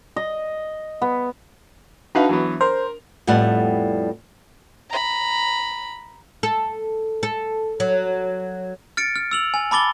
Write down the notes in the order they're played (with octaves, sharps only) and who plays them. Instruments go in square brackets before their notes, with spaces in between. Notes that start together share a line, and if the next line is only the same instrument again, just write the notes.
[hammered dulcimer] D#5
B3
[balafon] D4 E5 A5 [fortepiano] D#4 B4 F5 [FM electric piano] F#4
[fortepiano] E3 F#3 B3
[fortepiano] A#4 [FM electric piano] C5
[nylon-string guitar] F2 A2 G3 B3 D5 F#5
[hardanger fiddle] A#5 B5
[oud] A4
A4
F#3
[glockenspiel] F6 A6 C#7 D7
F6
E6 F7 F#7
G#5
A5 B5 D6 A6 G7